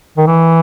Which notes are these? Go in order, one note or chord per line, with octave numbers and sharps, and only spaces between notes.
D#3
E3